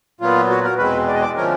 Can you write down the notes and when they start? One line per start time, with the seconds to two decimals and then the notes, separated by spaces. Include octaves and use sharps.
0.20 A#2 F#3 B3 F4
0.50 F#4
0.64 A#4
0.78 E2 B2 G#3 C4 B4
1.08 D5
1.14 D#5
1.22 D5
1.36 D3 F3 A3 C#4 A#4